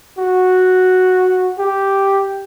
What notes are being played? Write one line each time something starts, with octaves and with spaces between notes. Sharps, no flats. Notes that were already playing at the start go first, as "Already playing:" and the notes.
F#4
G4